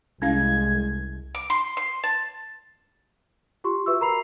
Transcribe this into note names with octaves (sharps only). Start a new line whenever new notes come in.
C2 G#3 C#4 E4 F5 G#6
D6
C6
C6
A5
F4 G4 C6 C#6
F#4 B4 E5 C#6 E6
A#4 A#5 B5 C7 F7